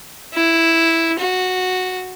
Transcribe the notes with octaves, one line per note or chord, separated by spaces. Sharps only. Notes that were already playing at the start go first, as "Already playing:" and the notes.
E4
F#4